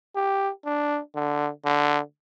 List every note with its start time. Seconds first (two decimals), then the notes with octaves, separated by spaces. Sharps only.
0.16 G4
0.65 D4
1.15 D3
1.65 D3